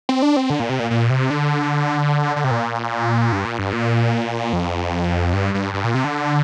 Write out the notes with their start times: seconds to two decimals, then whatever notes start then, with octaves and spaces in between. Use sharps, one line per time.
0.09 C4
0.22 D4
0.36 C4
0.50 D3
0.60 A#2
0.69 C3
0.79 A#2
0.90 A#2
1.10 C3
1.30 D3
2.36 D3
2.44 C3
2.51 A#2
3.32 G2
3.45 A#2
3.58 G2
3.73 A#2
4.53 F2
5.33 G2
5.54 G2
5.74 G2
5.84 A#2
5.94 C3
6.04 D3